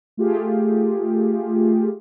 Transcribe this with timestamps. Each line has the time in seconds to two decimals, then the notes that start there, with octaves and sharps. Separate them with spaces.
0.17 A3 F4 G4 G#4